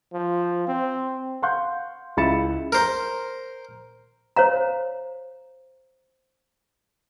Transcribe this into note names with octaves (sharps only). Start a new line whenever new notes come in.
F3
C4
F5 F#5 C6 C#6 F#6 G6
C#2 E4 B5 A6 C#7 E7
A#4 C5
C5 C#5 F5 A#5